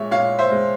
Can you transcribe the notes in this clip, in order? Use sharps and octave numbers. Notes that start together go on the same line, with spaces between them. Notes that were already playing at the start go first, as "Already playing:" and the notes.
Already playing: A#2 G#3 C#5 E5
A#2 C#5 F5
C5 E5
G#3